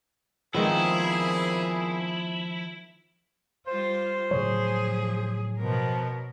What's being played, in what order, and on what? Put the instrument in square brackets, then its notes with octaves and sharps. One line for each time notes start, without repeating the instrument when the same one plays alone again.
[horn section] A#2 C4 G#4 [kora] D#3 G#3 B3 [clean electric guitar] F3 [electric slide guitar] E4
[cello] G3 F4 [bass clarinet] C5
[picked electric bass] A2 C#3 F#3 [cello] F3 G#4 [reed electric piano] C#5
[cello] B2 A#4 [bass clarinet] F3